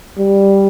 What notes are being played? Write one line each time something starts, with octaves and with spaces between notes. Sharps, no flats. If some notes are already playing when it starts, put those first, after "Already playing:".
G3